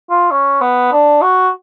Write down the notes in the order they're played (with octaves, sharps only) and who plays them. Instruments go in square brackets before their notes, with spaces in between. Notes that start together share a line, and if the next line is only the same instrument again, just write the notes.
[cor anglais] F4
C#4
B3
D4
F#4